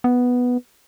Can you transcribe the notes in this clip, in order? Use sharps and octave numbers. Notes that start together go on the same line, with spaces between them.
B3